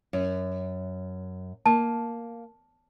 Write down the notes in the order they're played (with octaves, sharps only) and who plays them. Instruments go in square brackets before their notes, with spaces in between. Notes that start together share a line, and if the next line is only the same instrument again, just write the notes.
[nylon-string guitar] F#2
[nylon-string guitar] A#3 [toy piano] A5